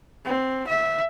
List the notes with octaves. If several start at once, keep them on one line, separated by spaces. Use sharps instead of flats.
C4
E5